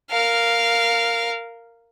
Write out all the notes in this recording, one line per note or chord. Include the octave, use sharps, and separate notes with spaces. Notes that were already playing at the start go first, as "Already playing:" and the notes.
A#4 F5